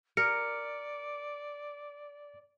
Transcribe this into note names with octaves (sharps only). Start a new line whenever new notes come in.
A#4 D5 C#7